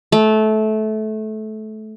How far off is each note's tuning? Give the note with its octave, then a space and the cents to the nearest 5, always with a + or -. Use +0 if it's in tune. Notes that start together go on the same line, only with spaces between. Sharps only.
A3 -20